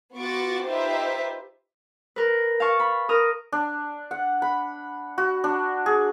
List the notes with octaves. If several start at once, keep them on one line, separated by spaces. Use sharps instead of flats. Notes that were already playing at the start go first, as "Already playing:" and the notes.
B3 F4 F#4 C#6 D6 A6
D#4 F4 G4 B4 C5 E5
A#4 B4
F5 A5 C#6
B5
A#4 D#6 F6
D4
F#5
B5
F#4
D4
G#4